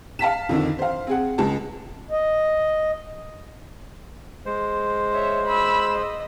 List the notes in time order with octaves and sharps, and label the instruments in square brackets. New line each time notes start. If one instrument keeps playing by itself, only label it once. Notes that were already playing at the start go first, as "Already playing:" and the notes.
[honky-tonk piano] F5 A5 B6 E7
F2 D3 D#3
C5 F5
C4 G#4 F#5
C#2 G#3 A5
[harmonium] D#5
[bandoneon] G#3 C5
[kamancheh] C#5 E5
B5 E6
D#5